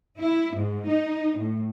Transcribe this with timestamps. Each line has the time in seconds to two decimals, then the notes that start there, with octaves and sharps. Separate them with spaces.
0.19 E4
0.56 G#2
0.88 D#4
1.38 A2